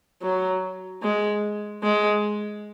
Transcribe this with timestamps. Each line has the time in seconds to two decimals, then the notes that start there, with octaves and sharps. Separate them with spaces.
0.22 F#3
1.02 G#3
1.83 G#3